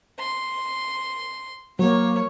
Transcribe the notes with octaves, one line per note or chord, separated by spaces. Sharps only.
C6
F#3 A#3 C#5